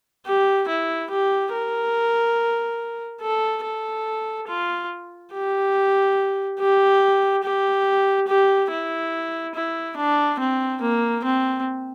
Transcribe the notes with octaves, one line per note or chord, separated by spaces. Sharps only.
G4
E4
G4
A#4
A4
A4
F4
G4
G4
G4
G4
E4
E4
D4
C4
A#3
C4